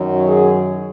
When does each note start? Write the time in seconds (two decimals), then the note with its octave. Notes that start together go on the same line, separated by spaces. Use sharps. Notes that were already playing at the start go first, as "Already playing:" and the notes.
Already playing: F#2 D#3 F#3
0.27 G#4